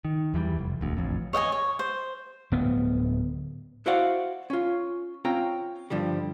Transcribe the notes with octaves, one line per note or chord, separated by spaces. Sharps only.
D#3
E2 E3 F3 G3
F1
E1 D2
A1 F2
C#5 D#5 F#5 G#5
C#5
C5
D1 B3
E4 F#4 C5 D5 F5 F#5
C#4 F4
C4 C#4 F4 G5 A#5
G2 D3 F3 G3